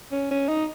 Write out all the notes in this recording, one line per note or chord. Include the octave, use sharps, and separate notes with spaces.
C#4
C#4
D#4